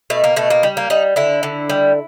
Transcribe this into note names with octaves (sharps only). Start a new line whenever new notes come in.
B2 A3
A#3
B2 A3
A#3
G3
A#3
G3 D#4
D3 E4
D3
G3